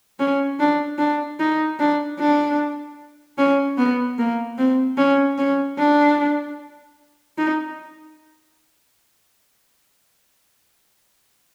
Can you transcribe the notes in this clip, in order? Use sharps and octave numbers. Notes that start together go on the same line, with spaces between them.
C#4
D4
D4
D#4
D4
D4
C#4
B3
A#3
C4
C#4
C#4
D4
D#4